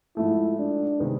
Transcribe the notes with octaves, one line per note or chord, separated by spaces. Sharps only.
G#2 F3 A3 E4
D4
C3 D#3 G#3 B3